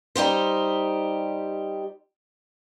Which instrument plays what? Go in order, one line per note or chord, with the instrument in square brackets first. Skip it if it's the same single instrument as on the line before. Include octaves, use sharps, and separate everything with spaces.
[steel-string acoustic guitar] G3 D#4 G4 C5